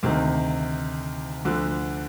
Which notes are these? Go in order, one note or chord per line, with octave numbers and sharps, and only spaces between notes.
D2 C3 D#3
D2 D3 F3